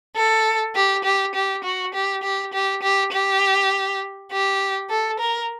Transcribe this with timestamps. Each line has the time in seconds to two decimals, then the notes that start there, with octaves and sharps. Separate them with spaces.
0.16 A4
0.75 G4
1.04 G4
1.35 G4
1.64 F#4
1.94 G4
2.23 G4
2.53 G4
2.82 G4
3.12 G4
4.32 G4
4.90 A4
5.19 A#4